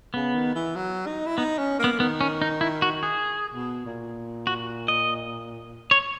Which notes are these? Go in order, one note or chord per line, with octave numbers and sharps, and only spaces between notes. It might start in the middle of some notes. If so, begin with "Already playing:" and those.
C#3 B3
D#3
E3
F#3
D#4
E4
B3 D#4
C#4
A#3 B3
D#3 B3
C#4
D#4
E4
F#4
G#4
B2
A#2
F#4
D#5
C#5